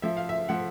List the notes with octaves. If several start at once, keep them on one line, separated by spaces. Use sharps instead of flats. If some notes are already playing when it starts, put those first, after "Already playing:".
F3 E5
F5
E5
F3 F#5